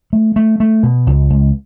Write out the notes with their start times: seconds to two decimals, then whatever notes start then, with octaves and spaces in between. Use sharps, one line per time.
0.13 A3
0.36 A3
0.60 A3
0.83 B2
1.07 C#2
1.30 C#2